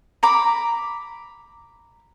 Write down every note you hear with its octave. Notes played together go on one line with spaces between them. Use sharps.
A#5 B5 D6